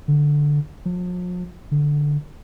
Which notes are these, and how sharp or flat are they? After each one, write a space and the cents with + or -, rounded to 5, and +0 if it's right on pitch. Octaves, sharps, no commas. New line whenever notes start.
D3 +0
F3 +45
D3 +0